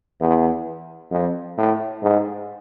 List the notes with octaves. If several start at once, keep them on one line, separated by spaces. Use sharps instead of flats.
E2
F2
A2
G#2